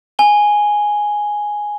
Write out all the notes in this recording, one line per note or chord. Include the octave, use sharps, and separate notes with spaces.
G#5 G7